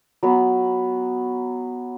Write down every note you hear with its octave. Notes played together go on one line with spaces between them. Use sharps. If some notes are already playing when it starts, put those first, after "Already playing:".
F#3 B3